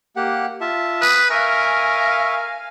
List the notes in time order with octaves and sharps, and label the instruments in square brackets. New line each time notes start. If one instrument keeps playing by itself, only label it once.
[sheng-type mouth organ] A#3 G4 F#5
F4 E5 A5
[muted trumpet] B4 [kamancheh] D#6
[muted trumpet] A#4 [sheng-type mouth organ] E5 C#6 [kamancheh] F5 G#5